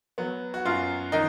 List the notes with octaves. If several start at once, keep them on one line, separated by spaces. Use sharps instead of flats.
F#3 B3
F#4
F#2 F4
D#3 D#4